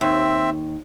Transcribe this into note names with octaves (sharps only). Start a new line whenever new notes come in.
D#2 C4 E5